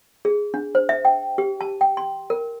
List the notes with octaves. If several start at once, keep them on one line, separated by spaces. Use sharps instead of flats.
G#4
D4
C5
E5
G5
G4
A5
G5
C6
A#4